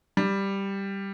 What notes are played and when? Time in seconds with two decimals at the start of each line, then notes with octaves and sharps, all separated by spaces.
0.17 G3